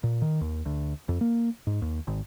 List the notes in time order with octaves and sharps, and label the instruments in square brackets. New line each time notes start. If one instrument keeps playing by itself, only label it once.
[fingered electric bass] A#2
D#3
D#2
D2
F2
A#3
G#2
D#2
G#1